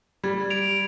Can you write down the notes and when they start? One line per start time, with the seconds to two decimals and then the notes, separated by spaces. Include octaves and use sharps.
0.24 G3 G#6
0.50 D7 F7